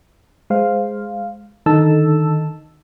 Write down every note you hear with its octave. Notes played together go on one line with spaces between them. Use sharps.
G#3 C5 F5
D3 D#3 D#4 A4 A5 E6